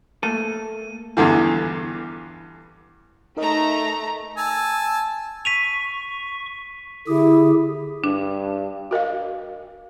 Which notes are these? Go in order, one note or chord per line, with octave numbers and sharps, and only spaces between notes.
A3 A#3 A4 D#7
E2 G2 D3 E3
A3 D#4 A#4 D#5 A#5
G#5 A5 E6
C#6 B6 D#7 F7
D3 E4 G4 G#4
G2 D4
F#4 A#4 D#5 F5